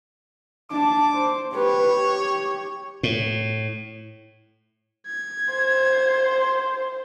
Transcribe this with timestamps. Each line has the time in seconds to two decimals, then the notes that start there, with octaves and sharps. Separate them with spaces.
0.71 D4 A5 D6
1.14 C5
1.53 G4 B4 C#5
1.88 G4
3.03 A2
5.07 G#6
5.54 C5